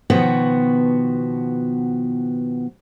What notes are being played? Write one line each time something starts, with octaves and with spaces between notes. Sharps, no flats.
B2 D#3 F3 B3 F#4